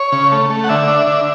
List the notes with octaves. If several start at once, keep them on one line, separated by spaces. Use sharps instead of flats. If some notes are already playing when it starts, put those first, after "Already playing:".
Already playing: C#5
C#3
A3
A3
F#5
D3 E5
D4
D3